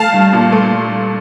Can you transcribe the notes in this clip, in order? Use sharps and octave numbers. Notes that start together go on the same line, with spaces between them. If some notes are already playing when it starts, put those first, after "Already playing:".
Already playing: A3 F5 A5
G2
A#2
A3